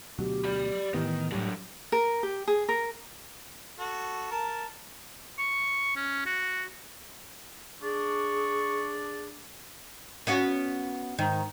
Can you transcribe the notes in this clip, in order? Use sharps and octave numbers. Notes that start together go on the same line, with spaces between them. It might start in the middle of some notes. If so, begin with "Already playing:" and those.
D2 B2 F#3 G4
D5 B5
A2 D#3 E3 B3
A2 F#3 G3 D4
A#4
G4
G#4
A#4
F#4 A4
A#4 A5
C#6
C#4
F#4
D4 G#4 C#6
B3 C#4 F#4
G#2 D#3